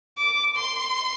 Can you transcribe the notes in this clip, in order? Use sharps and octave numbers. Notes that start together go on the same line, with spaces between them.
D6
C6